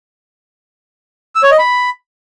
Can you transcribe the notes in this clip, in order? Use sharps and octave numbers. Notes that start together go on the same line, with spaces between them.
E6
C#5
D#5
B5